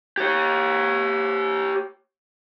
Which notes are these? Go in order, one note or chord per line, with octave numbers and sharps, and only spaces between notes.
G4 C#5